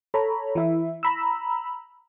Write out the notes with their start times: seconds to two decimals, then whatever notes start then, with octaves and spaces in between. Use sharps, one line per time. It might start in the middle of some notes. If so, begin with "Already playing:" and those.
0.14 A4 C#5 A#5 B5
0.55 E3 E4 E5
1.03 A#5 B5 E6